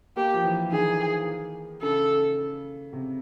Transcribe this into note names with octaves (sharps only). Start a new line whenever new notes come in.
A#3 G4
F3
E3
D#3 G#4
C#3 A4
C3